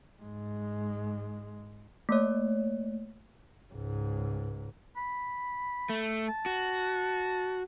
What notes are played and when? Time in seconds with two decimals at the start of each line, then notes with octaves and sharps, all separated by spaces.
0.22 G#2 G#3
2.09 A3 A#3 C#5
3.73 C#2 G#2
4.96 B5
5.89 A3
6.28 A5
6.46 F#4